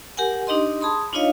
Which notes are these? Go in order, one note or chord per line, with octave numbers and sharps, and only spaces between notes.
G4 A#4 F#5 G#5
D4 D#4 G4 D#5 C6
G#4 A5 B5 C6 D#6
D4 D#4 F4 C#5 D#5 F5